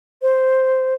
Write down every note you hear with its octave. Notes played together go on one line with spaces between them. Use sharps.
C5